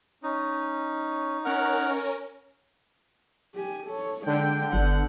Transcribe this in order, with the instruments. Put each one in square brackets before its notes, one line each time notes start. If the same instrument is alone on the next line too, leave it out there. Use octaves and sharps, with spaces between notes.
[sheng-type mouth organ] C#4 [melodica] D#4
[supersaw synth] C#4 A#4 [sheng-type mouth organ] F#5 F6
[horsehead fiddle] G4 G#5
A4 C#5
[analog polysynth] D3 [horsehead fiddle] G#3 G5 [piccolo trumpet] G6
[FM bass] G1 [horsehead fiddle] B3 F#5